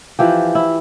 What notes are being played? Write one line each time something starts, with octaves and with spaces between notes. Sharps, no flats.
E3 F3 G4
E4